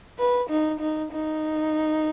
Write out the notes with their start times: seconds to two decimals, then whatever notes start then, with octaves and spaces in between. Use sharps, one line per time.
0.19 B4
0.50 D#4
0.80 D#4
1.12 D#4